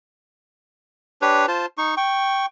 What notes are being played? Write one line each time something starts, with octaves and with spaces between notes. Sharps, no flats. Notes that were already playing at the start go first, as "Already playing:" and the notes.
D4 G4 B4 C#5
F4 C5 A5
D#4 C#6
G5 C#6